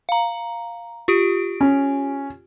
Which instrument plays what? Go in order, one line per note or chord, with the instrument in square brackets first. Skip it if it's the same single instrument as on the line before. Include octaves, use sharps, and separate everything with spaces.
[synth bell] F5 A#5
F4 G4 D7
[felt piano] C#4